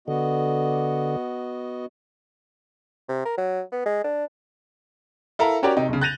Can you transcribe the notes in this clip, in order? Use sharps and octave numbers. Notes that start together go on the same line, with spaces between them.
D3 B3 F#4 D#5
C3
A#4
F#3
B3
G#3
D4
E4 A4 A#4 F5 A#5
C#4 F#4 G4 A#4 C#5 D5
C3 D#4 G5
B1 C#3
F#6 G6 A6 A#6 D#7 F7